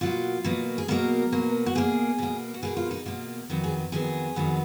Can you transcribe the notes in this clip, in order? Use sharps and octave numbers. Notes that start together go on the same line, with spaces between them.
B2 F#3 A#3 F4
B2 F#3 A#3
G#4
B2 F#3 A#3 A#4
B2 F#3 A#3
F#4
B2 A#3 G#4
B2 A#3
F#4
B2 A#3 G#4
F4
D#4
B2 A#3 F4
F2 D#3 F#3 B3
G#4
F2 D#3 F#3 B3 G#4
F2 D#3 F#3 B3